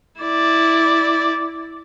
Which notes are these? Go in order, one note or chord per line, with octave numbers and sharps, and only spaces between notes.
E4 D5